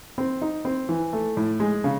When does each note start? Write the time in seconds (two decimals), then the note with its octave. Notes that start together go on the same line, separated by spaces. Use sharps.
0.18 C4
0.42 D#4
0.65 C4
0.89 E3
1.13 A3
1.37 A2
1.60 G#3
1.84 C#3